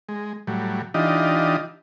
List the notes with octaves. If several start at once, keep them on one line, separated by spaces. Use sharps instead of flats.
G#3
A2 F#3 G3
E3 D4 D#4 F4 G4 D#5